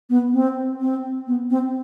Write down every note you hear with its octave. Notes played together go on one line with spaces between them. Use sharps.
B3
C4
C4
B3
C4